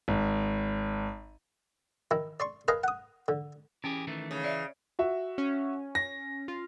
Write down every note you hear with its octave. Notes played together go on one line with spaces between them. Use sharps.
G#1
D#3 E4
D5 C6 C#6
A#4 B4 D#5 F5 G#5 A#5
F#5 D#6
D3
E3 C#4 G4 G#4
D#3 E3 A3
C#3
E3 D5 E5
F#4 E5
C#4
A#6
F4